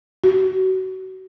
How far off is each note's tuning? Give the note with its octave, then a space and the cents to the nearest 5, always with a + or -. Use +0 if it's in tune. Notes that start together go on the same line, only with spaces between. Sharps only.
F#4 +30